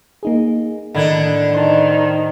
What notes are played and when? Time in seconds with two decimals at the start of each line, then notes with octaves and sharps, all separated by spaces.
0.23 A#3 D#4 G#4
0.94 A2 D3 D#3 D4 D#5 F#5 B5 G#6
1.53 D#3 C5 A5